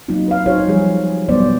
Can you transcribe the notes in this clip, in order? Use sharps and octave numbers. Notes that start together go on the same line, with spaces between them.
F#3 A#3 C4 D#4 F4
B4 F5
D#4 F4 F#4 G#4 C5 C#5
F3 G3 G#4
F#3 G3 B3 C5 D5